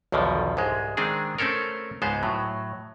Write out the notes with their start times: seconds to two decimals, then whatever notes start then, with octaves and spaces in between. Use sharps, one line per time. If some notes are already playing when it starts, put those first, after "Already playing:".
0.12 B1 E2 B2 D3 D#3 F3
0.57 C2 G#2 G#3
0.97 D#3 G#3 C4 D4 G#4
1.39 A3 C4 C#4 A4 A#4
2.02 C#2 G#2 G#3 B3 C5
2.23 A2 F#3